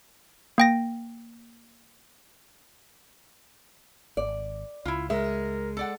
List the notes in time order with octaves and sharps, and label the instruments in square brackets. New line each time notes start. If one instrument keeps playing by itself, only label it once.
[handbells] A#3 G5 A#6
[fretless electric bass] G#1 [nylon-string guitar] D5
[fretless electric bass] C#2 [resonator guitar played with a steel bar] E4 F4
[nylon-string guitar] G#3 [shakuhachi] A#4 [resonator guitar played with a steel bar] E5
[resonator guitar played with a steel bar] A4 D5 F#5